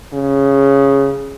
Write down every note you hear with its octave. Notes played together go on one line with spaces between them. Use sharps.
C#3